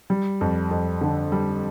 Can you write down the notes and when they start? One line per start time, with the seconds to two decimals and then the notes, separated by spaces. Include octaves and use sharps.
0.10 G3
0.41 F2
0.71 F2
1.01 D3
1.32 G3